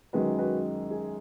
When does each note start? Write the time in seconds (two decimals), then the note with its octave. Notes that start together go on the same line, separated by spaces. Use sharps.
0.13 F#2 D#3 G#3 F#4 B4
0.38 F#4 B4
0.91 G#4